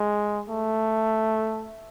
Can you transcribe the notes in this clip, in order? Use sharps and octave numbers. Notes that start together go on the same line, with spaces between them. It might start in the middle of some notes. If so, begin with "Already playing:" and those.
Already playing: G#3
A3